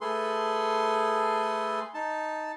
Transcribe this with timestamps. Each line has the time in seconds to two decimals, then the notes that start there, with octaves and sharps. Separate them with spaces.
0.01 A3 G#4 A4 B4 C6
1.94 D#4 A5